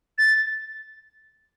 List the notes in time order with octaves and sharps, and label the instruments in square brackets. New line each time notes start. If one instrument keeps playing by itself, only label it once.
[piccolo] A6